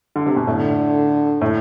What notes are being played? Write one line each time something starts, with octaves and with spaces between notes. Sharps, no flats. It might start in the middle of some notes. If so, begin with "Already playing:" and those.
D3
C3
B2
A2 D3
A2